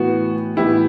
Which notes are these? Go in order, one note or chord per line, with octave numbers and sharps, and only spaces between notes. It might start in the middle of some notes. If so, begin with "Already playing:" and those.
Already playing: A2 E3 B3 F#4
A2 E3 B3 E4 G4